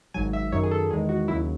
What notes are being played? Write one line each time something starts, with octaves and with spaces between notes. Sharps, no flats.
G#1 G#2 F#3 G#5
E5
F#2 D#3 F#3 C#5
G#4
A4
E2 D#3 G#3 G#4
F#4
D#2 C#3 F#3 E4